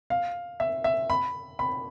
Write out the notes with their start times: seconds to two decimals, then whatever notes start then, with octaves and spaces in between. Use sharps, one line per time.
0.10 F5
0.60 E5
0.84 E5
1.10 B5
1.59 B5